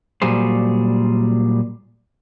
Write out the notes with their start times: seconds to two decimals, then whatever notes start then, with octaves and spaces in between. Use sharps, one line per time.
0.22 A#2 F#3 G3 G#4 C5